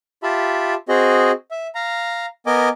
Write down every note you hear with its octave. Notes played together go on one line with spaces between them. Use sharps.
F4 G4 E5 A5 B5
C4 F#4 G#4 D#5
E5
F5 A#5
B3 A#4 D#5 G#5 D6